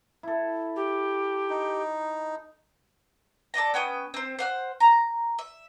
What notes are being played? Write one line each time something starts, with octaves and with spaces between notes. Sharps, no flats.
E4 A4
G4
D#4
A4 D5 D#5 A#5
B3 C#4 G5 D#6
C4 C5
C5 F#5 F6
A#5
E5